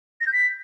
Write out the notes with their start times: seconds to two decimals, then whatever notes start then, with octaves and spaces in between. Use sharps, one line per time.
0.20 A#6
0.26 G6
0.32 B6